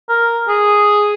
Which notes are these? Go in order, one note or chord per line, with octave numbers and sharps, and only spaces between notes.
A#4
G#4